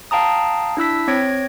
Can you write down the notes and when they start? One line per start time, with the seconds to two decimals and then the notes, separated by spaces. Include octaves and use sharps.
0.11 F5 G5 A5 A#5 D#6
0.77 D4 E4 E6 B6
1.08 C4 C#5 G#6 A#6 D7